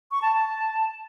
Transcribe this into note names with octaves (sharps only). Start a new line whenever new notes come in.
C#6
A5
A5